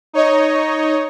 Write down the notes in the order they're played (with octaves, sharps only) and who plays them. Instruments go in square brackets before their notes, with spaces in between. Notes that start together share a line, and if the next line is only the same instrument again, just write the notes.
[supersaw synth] D#4 C#5 D#5